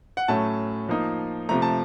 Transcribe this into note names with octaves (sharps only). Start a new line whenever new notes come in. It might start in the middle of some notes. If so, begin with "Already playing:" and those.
F#5
A2 F#3 A3 C#4 A5
F3 A#3 D#4
C3 F3 A3 A#5
A5